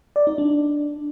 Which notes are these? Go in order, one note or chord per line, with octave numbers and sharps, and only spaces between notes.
D5
D#4
D4